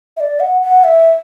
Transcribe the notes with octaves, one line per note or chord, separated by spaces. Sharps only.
E5
D5
F#5
F#5
E5